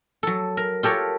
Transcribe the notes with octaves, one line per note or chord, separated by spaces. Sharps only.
F#3 A4
A#4
F4 G4 A4 A#4 C#5